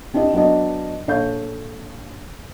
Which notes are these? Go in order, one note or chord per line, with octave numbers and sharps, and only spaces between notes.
C4 D4 E4 G4 D#5
F#3 B3 D4 D#5
A#1 A4 C#5 F5 G6